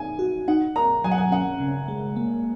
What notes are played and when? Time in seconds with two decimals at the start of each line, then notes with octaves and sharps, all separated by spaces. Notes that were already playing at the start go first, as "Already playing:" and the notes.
Already playing: D#4 G#5
0.19 F#4
0.48 D#4 F#5
0.76 A#4 A#5
1.04 F#3 G#5
1.11 F#5
1.18 G#5
1.32 C#4 F#5
1.60 C#3
1.88 G#3
2.16 A#3